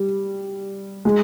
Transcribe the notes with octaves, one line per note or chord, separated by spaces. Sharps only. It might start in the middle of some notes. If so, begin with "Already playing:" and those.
Already playing: G3
G#3